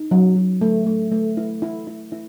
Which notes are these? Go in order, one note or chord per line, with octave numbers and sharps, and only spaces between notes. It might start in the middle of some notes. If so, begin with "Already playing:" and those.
Already playing: D#4
F#3
F#3
A3
A3
A3
E4
E4
E4
E4